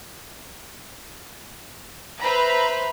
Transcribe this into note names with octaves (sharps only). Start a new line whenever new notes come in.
B4 C5 E5 A#5 B5